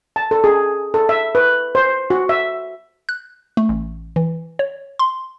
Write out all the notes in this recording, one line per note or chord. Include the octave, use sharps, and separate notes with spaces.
A5
A4
G#4
A4
E5
B4
C5
F#4
E5
F#6
A3
A1
E3
C#5
C6